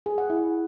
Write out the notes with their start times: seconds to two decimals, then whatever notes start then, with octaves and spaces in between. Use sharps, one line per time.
0.06 G#4
0.18 F#5
0.30 E4